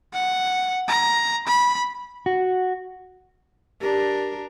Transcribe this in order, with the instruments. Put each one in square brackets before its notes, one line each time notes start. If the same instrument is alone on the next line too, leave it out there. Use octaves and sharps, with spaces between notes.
[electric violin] F#5
A#5
B5
[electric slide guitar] F#4
[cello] D4 A#4 [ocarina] G4